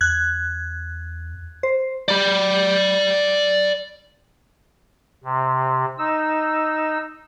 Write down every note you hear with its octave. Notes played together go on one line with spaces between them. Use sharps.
E2 F#6 G#6
C5
D5 B5
C3
D#4 E6